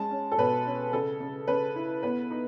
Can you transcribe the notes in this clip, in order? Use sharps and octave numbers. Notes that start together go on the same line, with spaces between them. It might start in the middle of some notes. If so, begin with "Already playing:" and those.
Already playing: G#3 C#4 A5
C#4
A4
B2 B4
C#4
C#3 A4
C#3
C#3 B4
E4
B3 B4
D#4